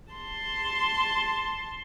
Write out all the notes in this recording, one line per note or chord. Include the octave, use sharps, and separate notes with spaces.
A5 C6